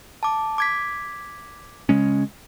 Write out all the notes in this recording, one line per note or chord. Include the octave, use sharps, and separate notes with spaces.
A5 D6
D6 G#6 B6
C#3 G#3 C#4